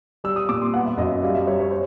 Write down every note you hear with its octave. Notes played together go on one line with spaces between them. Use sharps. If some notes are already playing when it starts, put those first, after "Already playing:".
G3 E6
D#6
A#2 D6
C6
B3 F#5
E5
F#2 D#5
E5
G3 F5
E5
G3 C#5
C#5
C5